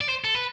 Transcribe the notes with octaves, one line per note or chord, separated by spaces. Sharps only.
D5
C5
A4
B4